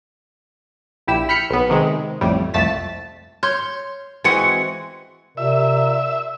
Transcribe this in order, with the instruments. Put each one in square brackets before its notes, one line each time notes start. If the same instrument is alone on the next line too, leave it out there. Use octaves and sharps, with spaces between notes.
[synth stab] A#1 E4 G4 E6
B5 F6 G6 B6 C#7
B1 B3
C3 D#3 G#3
A1 F2 A2 G3
C2 F2 A3 A5 A6 B6
[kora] C#5 [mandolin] C6 F6 G6
[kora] E3 G#3 C4 [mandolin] F#4 F#5 G#5
[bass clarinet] C3 [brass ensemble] F4 A#4 D5 [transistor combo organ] E5